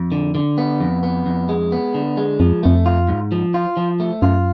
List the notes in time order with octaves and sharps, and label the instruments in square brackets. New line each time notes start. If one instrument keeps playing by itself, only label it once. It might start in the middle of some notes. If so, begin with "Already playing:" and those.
Already playing: [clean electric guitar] F2
D3
D3
B3
F2
B3
F2
G#3
B3
D3
G#3
[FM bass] F2 [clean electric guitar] F3
[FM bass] F2 [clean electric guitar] A3
[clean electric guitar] F4
G#2
F3
F4
F3
A3
[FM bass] F#2 [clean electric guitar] F4